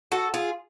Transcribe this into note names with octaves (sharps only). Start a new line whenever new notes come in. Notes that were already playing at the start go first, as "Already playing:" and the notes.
F#4 A4
F4 G#4